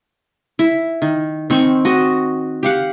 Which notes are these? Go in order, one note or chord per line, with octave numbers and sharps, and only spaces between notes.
E4
D#3
D#3 C4 C#6
F#4 D#5
G4 F5 F#5